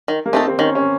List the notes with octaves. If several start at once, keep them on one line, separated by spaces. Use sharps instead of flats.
D#3
A#3
A3 C4 D#4 A4
C4
D#3 C#4
C#4